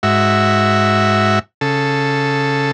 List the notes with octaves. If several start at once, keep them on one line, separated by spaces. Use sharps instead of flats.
G#2 F#4 E5
C#3 A4